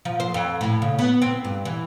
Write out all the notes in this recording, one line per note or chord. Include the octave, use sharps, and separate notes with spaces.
F3
C5
F2
A2
C#3
B3
C4
G2
E3